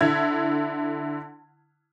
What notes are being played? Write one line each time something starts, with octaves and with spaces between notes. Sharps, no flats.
D3 E4 G#6